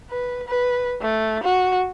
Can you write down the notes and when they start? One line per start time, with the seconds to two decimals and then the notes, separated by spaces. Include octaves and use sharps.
0.10 B4
0.48 B4
1.01 A3
1.43 F#4